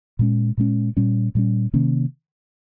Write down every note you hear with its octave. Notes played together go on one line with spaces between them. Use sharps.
A#2 G#3 C#4
A#2 G#3 C#4
A#2 G3 C#4
A#2 G3 C#4
C3 D#3 A#3 C#4